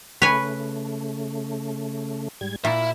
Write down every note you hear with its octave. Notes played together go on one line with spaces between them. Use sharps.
C#3 A3 B4 C#5 G#5
G#2 G3 G#6
A#2 E4 F4 E5